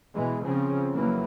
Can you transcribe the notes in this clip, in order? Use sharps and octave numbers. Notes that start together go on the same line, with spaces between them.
B2 E3 G#3
C#3 F3 C4 C#4
F2 C#3 E3 F#3 A#3